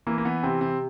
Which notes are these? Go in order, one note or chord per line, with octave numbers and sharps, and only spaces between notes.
E3 A#3
A#3
E3 B3
C3 C4
C3 C4